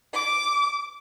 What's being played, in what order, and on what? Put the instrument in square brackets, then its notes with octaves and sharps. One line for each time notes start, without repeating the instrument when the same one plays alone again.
[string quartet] D6